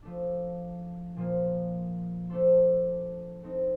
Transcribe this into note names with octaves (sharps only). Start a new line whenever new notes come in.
F3 A3 D4
A#2 F3 A#3
A3 D4 A4 C5
A3 C4 D#4